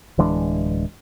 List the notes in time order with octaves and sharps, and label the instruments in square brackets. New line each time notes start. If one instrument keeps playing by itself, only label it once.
[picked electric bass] D1 E3 G#3 D4